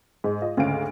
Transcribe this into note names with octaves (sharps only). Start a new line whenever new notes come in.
G#2
F4 D#5
D2 G#2 C#3 C#4 F5 D7